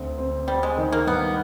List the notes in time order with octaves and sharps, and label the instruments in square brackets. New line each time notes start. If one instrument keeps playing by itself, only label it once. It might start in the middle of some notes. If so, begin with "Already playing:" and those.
Already playing: [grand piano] D2 C4
C4
[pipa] G3 [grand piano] C4
[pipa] G#3
[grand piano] D#3
[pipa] A#3
[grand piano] G2 [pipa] B3